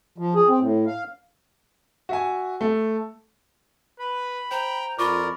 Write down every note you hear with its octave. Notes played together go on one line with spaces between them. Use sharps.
F3
G#4
C4
A2
F5
F#4 E5 G#5
A3
B4 B5
C5 G5 A#5
F2 F4 A#4 D5 B5 C#6 D6